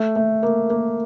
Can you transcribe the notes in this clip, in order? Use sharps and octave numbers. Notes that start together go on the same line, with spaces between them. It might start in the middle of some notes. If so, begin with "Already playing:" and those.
Already playing: A3
A3
A#3
A#3